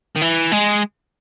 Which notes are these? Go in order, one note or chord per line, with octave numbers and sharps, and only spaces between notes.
D#3
E3
G#3